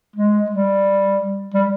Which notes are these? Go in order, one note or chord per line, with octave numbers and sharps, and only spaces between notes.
G#3
G3
G3